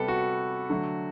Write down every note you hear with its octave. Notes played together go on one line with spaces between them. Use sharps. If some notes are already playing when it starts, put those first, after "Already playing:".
Already playing: C3 G3 B3 A4 B4 G5
F#4
D3 F#3 A3